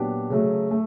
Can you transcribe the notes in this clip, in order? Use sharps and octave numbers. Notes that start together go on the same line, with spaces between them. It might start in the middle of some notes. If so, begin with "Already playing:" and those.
Already playing: A#2 F#3 B3 D4 G4
C#3 F#3 A3
A3